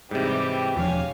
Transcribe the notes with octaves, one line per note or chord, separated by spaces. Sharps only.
G#2 C3 E3 G3 G4
E1 F3 D4 C#5 F5 G#5